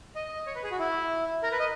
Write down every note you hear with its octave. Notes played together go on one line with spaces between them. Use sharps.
D#5
C#5
B4
G#4
F#4
E4
A#4
B4
D#5